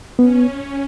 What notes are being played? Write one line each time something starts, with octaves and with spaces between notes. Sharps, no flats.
B3 C#4